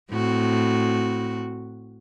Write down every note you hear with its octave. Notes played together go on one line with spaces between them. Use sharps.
A2 C4 F#4